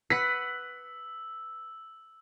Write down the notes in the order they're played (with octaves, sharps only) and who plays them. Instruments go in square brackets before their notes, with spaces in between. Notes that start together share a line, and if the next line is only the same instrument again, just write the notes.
[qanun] B4 F#5 [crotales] E6 [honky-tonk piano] B6